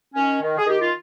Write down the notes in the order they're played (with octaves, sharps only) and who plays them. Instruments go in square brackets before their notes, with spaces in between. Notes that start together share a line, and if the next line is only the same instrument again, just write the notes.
[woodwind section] D#3 C#4
D#3
G#4
D#3 G4
F4